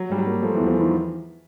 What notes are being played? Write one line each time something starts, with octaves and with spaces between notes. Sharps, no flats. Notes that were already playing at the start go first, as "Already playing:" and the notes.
Already playing: F#3
G#2 G3
F#3
A#3
F3 A3
E2 E3
F3
D#3 E3